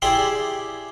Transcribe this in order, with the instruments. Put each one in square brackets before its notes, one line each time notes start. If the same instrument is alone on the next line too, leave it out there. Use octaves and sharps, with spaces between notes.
[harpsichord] E4 G4 G#4 D5 C6